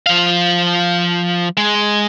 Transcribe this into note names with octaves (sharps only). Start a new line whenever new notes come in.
F3 F5
G#3